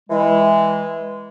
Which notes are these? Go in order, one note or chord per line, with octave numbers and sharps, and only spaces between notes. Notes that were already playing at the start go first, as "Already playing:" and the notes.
E3 G#3